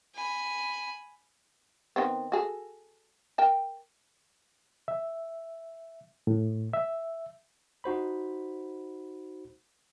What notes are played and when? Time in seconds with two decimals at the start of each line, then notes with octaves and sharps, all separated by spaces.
0.15 G#5 B5
1.96 D#3 B3 C4
2.32 F#4 G#4 A4
3.38 A#4 G5 A5
4.88 E5
6.27 A2
6.73 E5
7.84 D#4 F#4 C5 B5